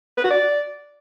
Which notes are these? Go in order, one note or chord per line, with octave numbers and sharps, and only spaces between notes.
B4
F#4
D5